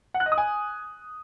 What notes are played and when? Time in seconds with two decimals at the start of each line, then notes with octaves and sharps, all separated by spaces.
0.14 F#5
0.20 F#6
0.26 D#5
0.32 D#6
0.38 G#5